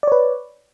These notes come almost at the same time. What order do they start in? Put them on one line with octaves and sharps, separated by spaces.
D5 C#5 B4